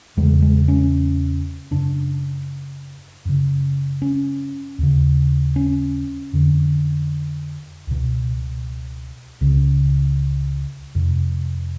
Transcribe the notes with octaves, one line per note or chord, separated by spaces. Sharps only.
E2 C#3 G#3
G#3
C#4
F#2 C#3 D4
F#2 C#3
C#4
D#2 C#3
C#4
F2 D3
C#2 B2
C#2 C#3
F2 C3